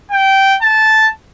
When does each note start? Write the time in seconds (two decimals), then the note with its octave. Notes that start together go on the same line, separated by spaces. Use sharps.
0.11 G5
0.62 A5